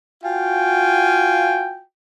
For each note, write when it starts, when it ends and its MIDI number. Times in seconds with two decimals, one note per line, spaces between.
0.24 1.81 65
0.24 1.81 66
0.24 1.81 77
0.24 1.81 79
0.24 1.81 80